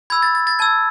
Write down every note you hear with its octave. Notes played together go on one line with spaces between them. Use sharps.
B5 E6 G#6
A6
A6
A6
A5 E6 G#6